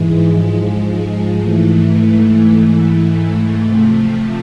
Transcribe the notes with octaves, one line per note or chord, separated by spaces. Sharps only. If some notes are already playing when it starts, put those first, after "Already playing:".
Already playing: G#2 E3 G#3
G#2 F3 G#3
G#2 E3 A3
G#2 E3 A3
C3 F3 A3